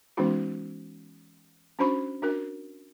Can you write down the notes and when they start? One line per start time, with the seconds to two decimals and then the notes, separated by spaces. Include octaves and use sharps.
0.17 E3 G#3 B3 C#4 D#4 F#4
1.79 C#4 D4 F#4 C5 B5 C#6
2.22 D4 F#4 A#4